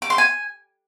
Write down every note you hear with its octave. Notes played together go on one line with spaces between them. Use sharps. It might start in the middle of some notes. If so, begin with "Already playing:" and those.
D6
C6
G#5